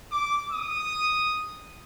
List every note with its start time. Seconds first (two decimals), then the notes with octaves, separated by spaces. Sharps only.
0.12 D6
0.51 D#6